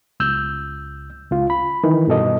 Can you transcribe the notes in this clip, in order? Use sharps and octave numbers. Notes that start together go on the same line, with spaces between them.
C#2 E6 G6
C#2 F4
B5
D#3 E3
G2 B2 A4 D#5